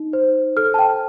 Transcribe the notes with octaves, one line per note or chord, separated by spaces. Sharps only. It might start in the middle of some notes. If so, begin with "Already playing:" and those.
Already playing: D#4
C5
A4 F6
A5
G5